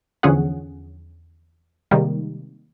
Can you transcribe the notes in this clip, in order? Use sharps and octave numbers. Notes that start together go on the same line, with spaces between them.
E2 D3 F3 C#4 G#4 F#5
C3 D#3 G3 G#3 A#3